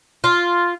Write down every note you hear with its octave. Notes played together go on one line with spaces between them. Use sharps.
F4